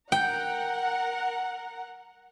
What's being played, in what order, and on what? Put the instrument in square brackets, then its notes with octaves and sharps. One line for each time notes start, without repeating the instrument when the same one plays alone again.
[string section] A#4 F#5 [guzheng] G5